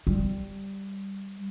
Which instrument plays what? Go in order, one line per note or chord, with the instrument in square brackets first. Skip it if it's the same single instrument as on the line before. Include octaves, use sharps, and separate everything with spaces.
[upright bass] G3